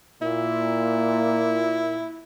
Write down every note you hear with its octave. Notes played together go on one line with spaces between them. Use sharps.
A#2 E4